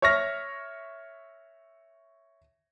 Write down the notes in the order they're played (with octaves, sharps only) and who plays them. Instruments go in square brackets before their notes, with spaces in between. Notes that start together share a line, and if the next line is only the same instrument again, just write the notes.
[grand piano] C#5 E5 C#6 F6 A#6